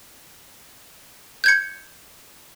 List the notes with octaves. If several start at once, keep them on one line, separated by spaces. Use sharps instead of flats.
G6 G#6 C#7